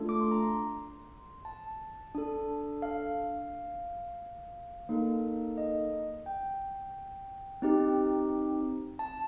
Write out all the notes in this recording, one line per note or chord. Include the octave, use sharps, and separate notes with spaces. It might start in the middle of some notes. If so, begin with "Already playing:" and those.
Already playing: A3 D4 F4 A4
D6
C6
A#5
C6
A5
D4 A4
F5
A#3 D#4 A4
D#5
G5
C4 D#4 G4
A5